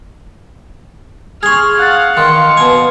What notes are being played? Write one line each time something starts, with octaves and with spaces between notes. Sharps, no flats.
G#4 C6 C#6 F6 G#6
F5 F#5 F#6 A6
D#3 F5 C6 C#7
B2 G#5